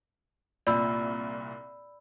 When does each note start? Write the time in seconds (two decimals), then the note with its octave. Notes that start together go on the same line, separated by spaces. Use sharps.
0.67 C2 A#2 D5 B5 E6